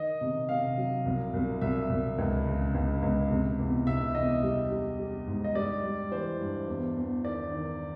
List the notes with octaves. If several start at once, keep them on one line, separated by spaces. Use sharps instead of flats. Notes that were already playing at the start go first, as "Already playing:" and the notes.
Already playing: D#3 D#5
C3
C3 F5
F#3
C2
C2
C2 E5
C2
C#2
C#3
C#2
C#2
C3
E2
C3 E5
E2 D#5
G3
G3
G3
G#2
D#5
G3 D5
G3
E3 C5
G2
E2
E2
D#3 D5
D#3